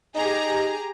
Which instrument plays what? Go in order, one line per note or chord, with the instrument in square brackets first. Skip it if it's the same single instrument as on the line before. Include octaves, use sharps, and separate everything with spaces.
[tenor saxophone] D#4 [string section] G4 G#4 A#5